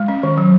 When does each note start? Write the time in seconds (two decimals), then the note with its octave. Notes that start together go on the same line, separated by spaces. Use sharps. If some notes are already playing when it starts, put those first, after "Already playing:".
Already playing: G#3
0.08 C#4
0.23 D#3
0.38 F#3